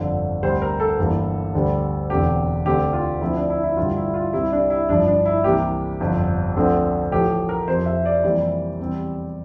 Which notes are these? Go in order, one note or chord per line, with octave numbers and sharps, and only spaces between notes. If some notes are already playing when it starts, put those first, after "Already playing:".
Already playing: G1 F2 D3
D2 C3 G3 C5
A#4
A4
G1 G2 E3 A#3
D2 D3 G3
E1 E2 D3 A3 C4 G4
D2 D3 A3 C4 G4
F4
D2 D3 F3 C4 E4
D4
E4
E4
A1 G2 D3 G3 F4
E4
F4
C2 C3 G3 C4 E4
D4
E4
G1 G2 F3 D4
D4
E4
C2 C3 E3 A#3 G4
G1 F2 D3
D2 D3 F3 A3 C4
A1 A2 F3 A3 G4
A#4
F2 C3 F3 C4 C5
E5
D5
F2 C3 E3 G3 A#3 D5
E2 C3 G3 C4